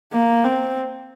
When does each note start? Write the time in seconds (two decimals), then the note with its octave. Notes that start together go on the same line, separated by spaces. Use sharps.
0.12 A#3
0.44 C4